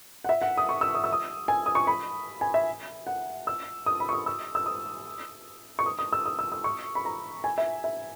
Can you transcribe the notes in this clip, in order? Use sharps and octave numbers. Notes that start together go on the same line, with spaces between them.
F#5
E5
F#5
D#6
C#6
E6
D#6
E6
D#6
G#5
D#6
C#6
B5
G#5
E5
F#5
E6
D#6
B5
C#6
D#6
E6
E6
D#6
C#6
D#6
D#6
E6
D#6
E6
E6
C#6
B5
A#5
G#5
E5
E5